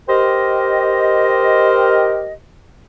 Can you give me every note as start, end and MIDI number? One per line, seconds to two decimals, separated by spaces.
0.09 2.33 67
0.09 2.33 70
0.09 2.27 72
0.09 2.33 75